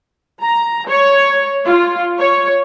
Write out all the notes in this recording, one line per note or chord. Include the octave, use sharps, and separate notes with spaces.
A#5
C#5
F4
C#5